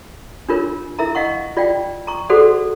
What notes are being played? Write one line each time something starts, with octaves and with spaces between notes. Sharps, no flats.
D4 F4 A#4 C#5
E4 A#4 E5 A#5
D#5 F5 F#5 C#6
F4 D5 F5 G5
A#5 C#6
F#4 G#4 A4 C5 D5 F#5